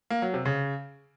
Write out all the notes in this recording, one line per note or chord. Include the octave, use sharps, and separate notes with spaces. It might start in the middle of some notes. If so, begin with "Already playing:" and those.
A#3
F#3
C3
C#3